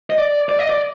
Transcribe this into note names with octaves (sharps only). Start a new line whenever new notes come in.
D#5
D5
D5
D#5
D5